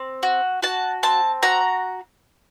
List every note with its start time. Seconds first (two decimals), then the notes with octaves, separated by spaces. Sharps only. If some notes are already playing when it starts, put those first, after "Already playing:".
Already playing: C4
0.23 F#4
0.62 F#4 A5
1.03 C4 A5
1.43 F#4 A#5